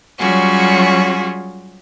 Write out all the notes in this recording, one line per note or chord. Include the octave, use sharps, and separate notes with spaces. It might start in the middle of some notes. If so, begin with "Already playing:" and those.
F#3 G3 C#4 F4 F#4 G#4